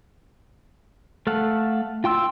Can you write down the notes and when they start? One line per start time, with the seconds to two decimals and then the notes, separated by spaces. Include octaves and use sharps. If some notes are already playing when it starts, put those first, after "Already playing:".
1.27 A3 A4 F5 F#5
2.04 F4 G5 C6 E6